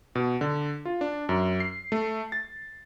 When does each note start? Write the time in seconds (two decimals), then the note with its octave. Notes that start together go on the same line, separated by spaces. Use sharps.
0.15 B2
0.41 D3
0.85 F4
1.01 D4
1.29 F#2
1.60 C7
1.92 A3
2.32 A6